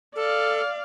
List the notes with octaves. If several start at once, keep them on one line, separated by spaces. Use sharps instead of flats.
A4 D5 F5